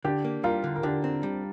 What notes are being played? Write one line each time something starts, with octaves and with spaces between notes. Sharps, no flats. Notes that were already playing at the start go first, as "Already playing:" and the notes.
D3 D4 G4
A#3
G3 F4 A#4
D3
A#4
D3 D4 G4
C4
G3